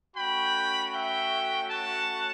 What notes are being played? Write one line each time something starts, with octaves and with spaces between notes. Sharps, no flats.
A3 C#4 F#4 G5 B5
E5 G5
F#5 A5